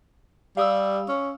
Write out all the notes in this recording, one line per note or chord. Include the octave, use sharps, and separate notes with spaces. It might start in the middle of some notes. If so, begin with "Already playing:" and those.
G3 F5 D#6 E6
C#4